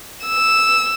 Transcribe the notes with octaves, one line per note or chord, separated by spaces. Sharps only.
E6